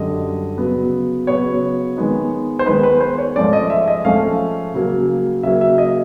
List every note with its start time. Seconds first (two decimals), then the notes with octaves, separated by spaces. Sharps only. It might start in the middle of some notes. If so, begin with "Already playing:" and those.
Already playing: F#2 D3 G3 D#5
0.58 C#3 F#3 B3
1.27 C#3 F#3 B3 C#5
1.97 D#3 G#3 B3 D#4
2.59 C5
2.66 D#3 G#3 B3 D#4 B4
2.83 B4
3.01 C5
3.18 C#5
3.36 G#2 F3 A3 C#4 D5
3.53 D#5
3.70 E5
3.88 D#5
4.05 G#2 F3 A3 C#4 F5
4.74 C#3 F#3 A#3
5.43 C#3 F#3 A#3 E5
5.61 E5
5.78 D#5